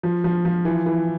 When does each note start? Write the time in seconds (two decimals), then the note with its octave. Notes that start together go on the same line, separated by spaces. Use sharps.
0.03 F3
0.24 F3
0.45 F3
0.65 E3
0.86 E3